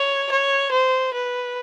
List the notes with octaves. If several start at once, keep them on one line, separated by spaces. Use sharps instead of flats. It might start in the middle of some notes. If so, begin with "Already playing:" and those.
Already playing: C#5
C#5
C5
B4